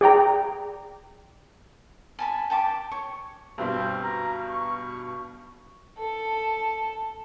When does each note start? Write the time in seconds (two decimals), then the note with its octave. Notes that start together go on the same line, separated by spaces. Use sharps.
0.01 G#4 D5 G5 A#5
2.19 G#5 A5 B5
2.50 G5 A5 B5 D6
2.91 C#5
3.58 G2 B2 G3 C4
4.04 A#5
4.50 C#6
5.98 A4 A5